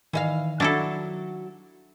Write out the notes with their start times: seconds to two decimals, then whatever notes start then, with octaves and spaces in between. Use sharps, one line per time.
0.13 D#3 E3 D#5 F5
0.60 F#3 D4 E4 A4